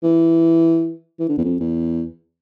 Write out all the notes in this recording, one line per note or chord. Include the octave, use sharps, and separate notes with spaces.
E3
E3
D3
E2
F2
E2